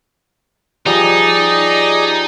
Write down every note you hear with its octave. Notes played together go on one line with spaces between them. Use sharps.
F3 G3 D#4 G#4 D5